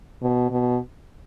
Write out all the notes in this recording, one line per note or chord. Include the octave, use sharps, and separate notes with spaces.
B2
B2